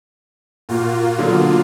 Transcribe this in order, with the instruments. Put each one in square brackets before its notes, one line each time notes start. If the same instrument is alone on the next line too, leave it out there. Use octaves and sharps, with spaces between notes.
[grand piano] A#2 [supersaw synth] A#3 F4 F#4
[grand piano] B2 D3 F#3